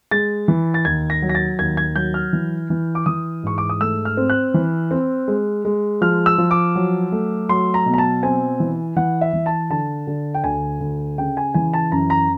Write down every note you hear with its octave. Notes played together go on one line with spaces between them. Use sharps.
G#3 A6
E3
A6
D#2 G#6
A#6
F#3
A#6
A6
D#2 G#6
G#6
F#3 G6
F6
E3
E3
D6
E3 D#6
G#2 C#6
D6
D#6
A3 E6
F6
C4
F#6
E3
C4
G#3
G#3
F3 F6
E6
F3
D6
F#3
A3
F#3 C6
A#5
B2
A#5
A5
C4 G#5
E3
E3 F#5
E5
E3
A5
D3 A5
D3
G5
D2 G#5
D2
C#3 G5
G#5
E3 G#5
A5
F#2 A#5
A#5